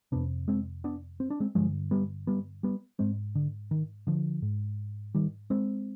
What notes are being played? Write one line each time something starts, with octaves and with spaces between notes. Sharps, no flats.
F2 C3 B3 D4
G#3 C4
B3 D4
C4
D4
G#3 C4
G2 D3 F3 G#3
G3 B3
G3 B3
G3 B3
G#2 G#3 C4
D3
D#3
D3 F3
G#2
D#3 G3
G#3 C4